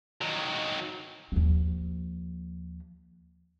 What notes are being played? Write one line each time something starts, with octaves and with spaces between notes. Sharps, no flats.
D#3 F#3
D#2 F3